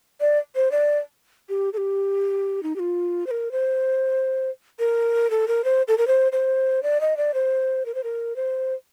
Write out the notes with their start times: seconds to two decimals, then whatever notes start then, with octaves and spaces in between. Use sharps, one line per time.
0.21 D5
0.55 C5
0.72 D5
1.49 G4
1.73 A4
1.77 G4
2.63 D#4
2.76 G4
2.79 F4
3.27 C5
3.31 A#4
3.52 C5
4.79 A#4
5.30 A4
5.48 A#4
5.64 C5
5.88 A4
5.98 A#4
6.07 C5
6.32 C5
6.83 D5
7.01 D#5
7.17 D5
7.34 C5
7.86 A#4
7.95 C5
8.04 A#4
8.36 C5